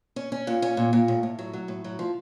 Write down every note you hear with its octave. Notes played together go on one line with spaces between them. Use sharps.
C#4
C#4
A#2
C#4
A#2
A#2
A2
A2
F#3
F#3
A2
F#3
F3